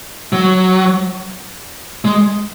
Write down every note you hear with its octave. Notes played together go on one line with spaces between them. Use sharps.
F#3
G#3